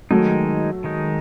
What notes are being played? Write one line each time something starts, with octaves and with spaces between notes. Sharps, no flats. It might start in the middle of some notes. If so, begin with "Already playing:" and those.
D#3 F#3 G#3 A3 D#4
D#3 G#3 D#4